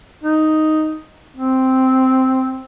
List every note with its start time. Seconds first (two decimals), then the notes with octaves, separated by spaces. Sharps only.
0.24 D#4
1.37 C4